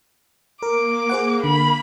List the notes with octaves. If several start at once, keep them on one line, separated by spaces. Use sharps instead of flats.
A#3 A#4 D6
G#4 C5 F#5
D3 B5